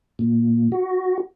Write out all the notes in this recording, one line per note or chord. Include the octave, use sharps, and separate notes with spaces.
A#2
F#4